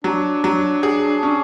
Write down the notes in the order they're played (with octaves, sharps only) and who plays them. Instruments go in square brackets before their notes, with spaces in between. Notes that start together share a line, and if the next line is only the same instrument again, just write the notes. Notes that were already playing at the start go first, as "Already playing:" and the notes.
[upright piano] F#3 [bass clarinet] D4
[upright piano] F#3
G#4
C#4